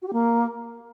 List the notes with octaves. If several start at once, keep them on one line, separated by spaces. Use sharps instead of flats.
F#4
G4
A#3